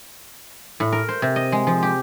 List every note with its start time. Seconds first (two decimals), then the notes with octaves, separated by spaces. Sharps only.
0.80 A2
0.92 A#4
1.08 C5
1.22 C3
1.36 D#5
1.52 G#3
1.67 F3
1.83 G4